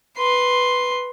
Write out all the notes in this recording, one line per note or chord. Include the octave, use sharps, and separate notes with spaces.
B4 C6